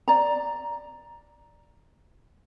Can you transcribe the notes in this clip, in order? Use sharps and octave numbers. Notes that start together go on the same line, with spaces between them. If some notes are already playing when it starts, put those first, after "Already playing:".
D5 A#5